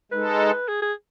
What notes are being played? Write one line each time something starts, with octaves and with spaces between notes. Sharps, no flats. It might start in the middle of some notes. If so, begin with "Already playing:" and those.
G#3 D#4 A4 B4
G#4
G#4